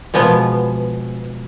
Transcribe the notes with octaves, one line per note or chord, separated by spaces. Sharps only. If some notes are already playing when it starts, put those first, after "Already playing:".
B2 F3 G#3 B3